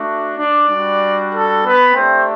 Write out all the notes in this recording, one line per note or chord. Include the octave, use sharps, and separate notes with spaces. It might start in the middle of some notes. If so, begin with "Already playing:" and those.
Already playing: A3 D4 F#4
D4 D5
G3 D4 F#4
A4
B3 B4
A3 C4 D4 G4 C5